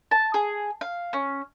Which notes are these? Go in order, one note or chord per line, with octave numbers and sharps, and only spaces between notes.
A5
G#4
F5
C#4